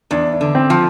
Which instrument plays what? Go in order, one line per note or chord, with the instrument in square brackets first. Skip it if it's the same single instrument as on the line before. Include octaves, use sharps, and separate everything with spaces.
[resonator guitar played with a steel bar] E2 [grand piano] D4
[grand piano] D4
[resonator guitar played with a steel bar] D3
[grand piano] C4
[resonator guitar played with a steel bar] F3